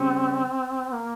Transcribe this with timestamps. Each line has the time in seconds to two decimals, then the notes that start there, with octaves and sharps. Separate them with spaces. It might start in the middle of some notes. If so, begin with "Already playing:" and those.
Already playing: C#3 G3 C4 C#4
0.92 A#3